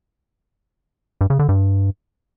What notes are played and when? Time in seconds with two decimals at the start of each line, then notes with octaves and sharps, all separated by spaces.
1.21 G2
1.30 C#3
1.39 D3
1.49 G2